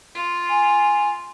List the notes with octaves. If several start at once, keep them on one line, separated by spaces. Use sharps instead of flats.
F4
G#5